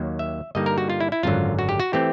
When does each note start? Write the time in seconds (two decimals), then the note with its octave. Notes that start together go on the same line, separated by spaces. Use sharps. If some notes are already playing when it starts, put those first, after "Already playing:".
Already playing: D#2 D#3 F#3 A#3
0.19 E5
0.55 G2 D3 G3 A#3 D#4 D#5
0.66 A#4
0.78 F#4
0.90 F4
1.00 E4
1.12 E4
1.23 G#1 F#2 D3 F#3 F4
1.59 F#4
1.69 G4
1.80 F#4
1.93 E3 A3 C4 G4